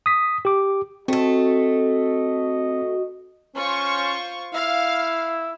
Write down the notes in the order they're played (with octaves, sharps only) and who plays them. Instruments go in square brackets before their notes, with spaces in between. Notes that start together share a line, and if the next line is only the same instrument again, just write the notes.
[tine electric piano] D#6 B6
G4 D6
[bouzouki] A3 A4 [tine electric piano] C4 [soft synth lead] F#4 [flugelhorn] D#5
[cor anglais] C#4 [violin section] F4 C5 C#6
[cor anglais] E4 [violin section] F5